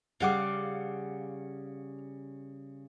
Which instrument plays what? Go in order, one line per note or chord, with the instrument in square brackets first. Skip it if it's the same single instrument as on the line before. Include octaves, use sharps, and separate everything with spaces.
[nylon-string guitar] C#3 G3 G#4 [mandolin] F5 F#5 D6